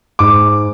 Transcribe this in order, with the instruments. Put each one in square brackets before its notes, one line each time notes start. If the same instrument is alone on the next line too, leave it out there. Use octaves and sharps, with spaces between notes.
[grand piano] G#2 D6